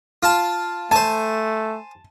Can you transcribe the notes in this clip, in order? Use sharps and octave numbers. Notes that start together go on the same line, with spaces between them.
F4 A5
A3 C5 G#5 A5